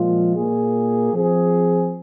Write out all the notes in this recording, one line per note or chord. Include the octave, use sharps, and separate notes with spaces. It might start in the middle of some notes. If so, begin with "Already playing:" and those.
Already playing: A#2 F3 G#3 F4
A#2 A#3 G#4
F3 C4 G#4